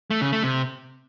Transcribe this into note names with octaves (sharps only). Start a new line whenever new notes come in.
A3
C#3
A3
C3